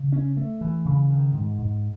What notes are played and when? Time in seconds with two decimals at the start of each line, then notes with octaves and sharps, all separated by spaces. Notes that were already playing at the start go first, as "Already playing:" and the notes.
Already playing: C#3
0.12 C#4
0.37 A3
0.61 E3
0.85 C#3
1.10 D#3
1.34 G#2
1.59 G#2